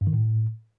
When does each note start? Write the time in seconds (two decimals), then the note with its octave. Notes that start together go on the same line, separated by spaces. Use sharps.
0.01 G2
0.07 D#3
0.13 A2